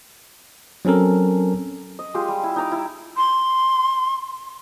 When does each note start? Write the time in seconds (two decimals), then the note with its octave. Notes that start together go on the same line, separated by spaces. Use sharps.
0.85 F#3 C4 C#4 A4 A#4
1.99 D#5
2.14 G#3 F4 G4
2.28 G3
2.43 E4
2.56 D#4 A#5 D6
2.72 E4
3.17 C6